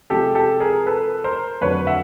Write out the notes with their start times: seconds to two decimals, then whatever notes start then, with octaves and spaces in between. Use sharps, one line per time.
0.10 C3 F3 G#3 G4 A4
0.35 G4 A4
0.60 G#4 A#4
0.86 A4 B4
1.24 A#4 C5
1.61 F2 D3 F#3 B4 C#5
1.87 E5 F#5